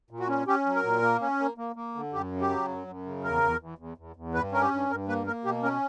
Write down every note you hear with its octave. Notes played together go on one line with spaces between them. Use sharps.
A#2
F#4
C#4
C#4 G4
F#3
A#4
A#2
A#3
C#4
A#3
A#3
A#3
D3
F#2 G4
C#3
G4
F#3
F#2
F#2
C#3
E2 A#4
E2
E2
E2
E2
E2
G2 B4
C#4 A#4
G4
G2
G2 A#4
A#3 B4
A#3 A#4
B2 G4
C#4 A#4